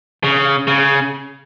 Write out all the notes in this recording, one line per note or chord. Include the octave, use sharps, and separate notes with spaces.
C#3
C#3